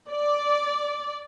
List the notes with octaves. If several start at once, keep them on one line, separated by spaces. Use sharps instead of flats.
D5